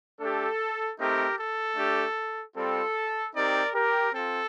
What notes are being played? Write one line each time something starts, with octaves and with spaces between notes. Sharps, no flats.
A3 D4 G4 A4
A3 C4 D#4 G4 A#4
A4
A3 D4 G4
G3 C4 F4 A4
C4 D#4 G4 A#4 D5
G4 A#4
C4 F4 A4